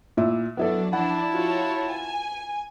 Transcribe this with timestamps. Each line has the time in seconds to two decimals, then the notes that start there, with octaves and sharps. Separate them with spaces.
0.17 A#2 E4
0.57 F#3 B3 D4 E4 A4
0.93 F3 D4 E4 F#5 A5
1.30 F4 F#4 C#5
1.90 G#5